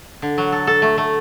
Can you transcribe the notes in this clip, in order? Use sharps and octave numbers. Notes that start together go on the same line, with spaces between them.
D3
F#3
A4
A4
A3
A3